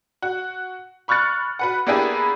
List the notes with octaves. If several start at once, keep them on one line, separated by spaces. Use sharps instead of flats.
F#4
B5 C#6 F6 F#6 A6 C#7
F#4 B4 F#5
A#3 B3 D4 E4 G4 G#4